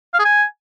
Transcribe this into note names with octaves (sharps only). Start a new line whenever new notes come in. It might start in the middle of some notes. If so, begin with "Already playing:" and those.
F5
G#4
G#5